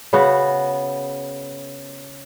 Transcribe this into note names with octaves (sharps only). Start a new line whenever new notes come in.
C#3 B3 F#4